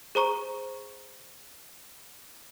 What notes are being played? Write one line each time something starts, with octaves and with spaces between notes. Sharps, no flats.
G#4 C5 A#5 C#6